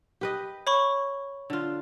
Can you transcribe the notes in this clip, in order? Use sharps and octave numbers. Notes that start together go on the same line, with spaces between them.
G4 B4 D#5
C#5 B5 C#6
D3 F4